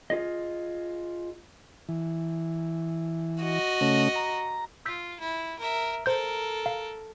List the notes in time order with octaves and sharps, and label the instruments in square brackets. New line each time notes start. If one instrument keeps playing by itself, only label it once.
[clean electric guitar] F4 G#4 D#5
[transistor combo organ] E3
[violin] F#4 D#5
[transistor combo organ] C#3 A3 C#4
A#5
[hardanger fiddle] F4 [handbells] E6 G6 B6
[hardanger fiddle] E4
A#4 E5
[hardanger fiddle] A4 A#4 [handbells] C5 G6
[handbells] F5